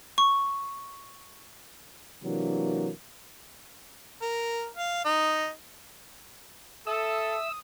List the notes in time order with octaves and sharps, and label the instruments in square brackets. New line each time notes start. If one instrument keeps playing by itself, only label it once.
[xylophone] C#6
[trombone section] C3 E3 F#3 A#3 D4
[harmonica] A#4
F5
D#4
[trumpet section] A4 [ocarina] E5 [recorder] D#6 [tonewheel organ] E6